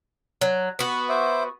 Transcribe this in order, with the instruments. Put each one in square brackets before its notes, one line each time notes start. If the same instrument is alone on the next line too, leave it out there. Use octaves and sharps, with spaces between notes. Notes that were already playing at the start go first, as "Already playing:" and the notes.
[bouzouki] F#3
B3 F#4
[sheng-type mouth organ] C5 E5 D6